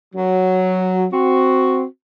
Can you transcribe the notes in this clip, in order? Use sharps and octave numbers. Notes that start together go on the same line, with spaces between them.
F#3
C4 F#4